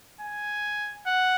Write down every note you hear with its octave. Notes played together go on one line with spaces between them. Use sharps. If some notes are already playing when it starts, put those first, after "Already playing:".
G#5
F#5